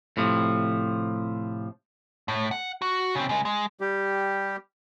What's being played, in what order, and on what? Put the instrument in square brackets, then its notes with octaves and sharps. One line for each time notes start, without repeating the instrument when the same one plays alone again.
[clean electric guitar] A2 C3 F3
[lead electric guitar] A2
F#5
F#4
C#3 C4
C#3 G#3
G#3
[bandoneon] G3 G4